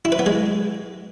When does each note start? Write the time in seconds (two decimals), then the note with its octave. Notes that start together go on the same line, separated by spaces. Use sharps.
0.05 E4
0.12 B4
0.19 B3
0.26 G#3